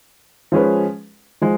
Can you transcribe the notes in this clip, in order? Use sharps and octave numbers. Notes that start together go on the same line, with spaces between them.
F3 G#3 C#4 G#4 B4
F3 G#3